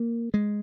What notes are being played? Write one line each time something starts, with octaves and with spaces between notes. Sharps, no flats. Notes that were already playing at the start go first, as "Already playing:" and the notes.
Already playing: A#3
G#3